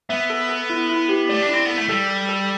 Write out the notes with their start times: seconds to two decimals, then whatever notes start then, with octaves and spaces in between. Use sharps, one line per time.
0.09 B3 E5
0.30 A4
0.49 A4
0.70 E4
0.89 E4
1.09 G4
1.29 A3 D5
1.42 D4
1.49 C4 E4
1.65 B3 A4
1.78 A3
1.88 G3 A4
2.08 A4
2.29 A4